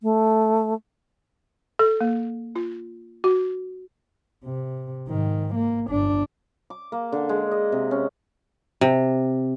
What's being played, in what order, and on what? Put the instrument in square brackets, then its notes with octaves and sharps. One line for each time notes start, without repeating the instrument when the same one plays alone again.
[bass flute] A3
[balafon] A4
A#3
F4
F#4
[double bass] C3
G#2 D#3
A#3
G1 D4
[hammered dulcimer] D6
A#3
D3
G#3
D#5
C3
C#4
[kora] C3